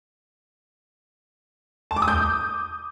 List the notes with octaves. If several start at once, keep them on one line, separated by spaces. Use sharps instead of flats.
A5
D6
D#6
G6